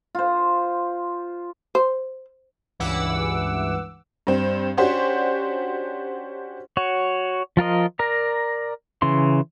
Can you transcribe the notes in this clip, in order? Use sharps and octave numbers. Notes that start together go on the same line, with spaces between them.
F4 C5
C5
C#2 G2 E3 F#5 D6 E6
G2 C4
C#4 D4 F#4 G4 C5
F#4 C#5
F3 F4 A#4 D#5
A#4 D5 A#5
C#3 E3 C6